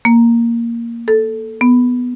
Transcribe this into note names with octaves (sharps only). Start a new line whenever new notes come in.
A#3
A4
B3